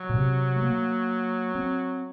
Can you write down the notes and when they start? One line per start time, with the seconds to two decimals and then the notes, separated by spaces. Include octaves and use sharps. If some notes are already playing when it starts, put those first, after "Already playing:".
Already playing: F#3
0.09 A#2
0.16 C3
0.56 A3
0.63 A#3
1.55 C4